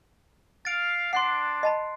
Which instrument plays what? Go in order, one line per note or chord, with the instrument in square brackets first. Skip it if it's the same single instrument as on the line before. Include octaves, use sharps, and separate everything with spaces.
[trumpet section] F5 [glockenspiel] A6 D7
[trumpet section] D4 [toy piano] F#5 [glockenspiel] C6 F#6 C7
[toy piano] D#5 A5 B5